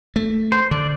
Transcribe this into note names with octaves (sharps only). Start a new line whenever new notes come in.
A3
C5
D3 D5